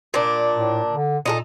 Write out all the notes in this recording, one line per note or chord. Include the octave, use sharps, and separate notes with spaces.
A#2 D4
A2
D3
A#2 D#4 F4 A4